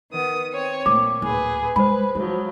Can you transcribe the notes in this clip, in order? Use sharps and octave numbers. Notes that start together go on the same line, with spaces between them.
D#3 B3 D#6
C4 C#5
A#2 A3 D6
D1 G#4 B4
G#3 B4 C5 B5
F3 F#3 G#3